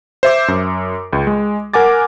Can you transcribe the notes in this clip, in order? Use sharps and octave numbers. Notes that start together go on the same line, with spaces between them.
C5 E5 D6
F#2
C#2
G#3
A#4 F#5 G#5 D6 A6